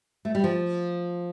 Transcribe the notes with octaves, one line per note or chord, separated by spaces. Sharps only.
A3
G3
F3